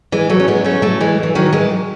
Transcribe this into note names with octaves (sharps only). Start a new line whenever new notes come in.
E3 G#3
F#3 A3
C#4
G#3 B3
A3 C#4
F#3 A3
E3 G#3
E3
D#3 F#3
E3 G#3